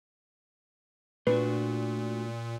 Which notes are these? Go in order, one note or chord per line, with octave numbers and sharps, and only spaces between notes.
A#2 A3 D4 F#4 B4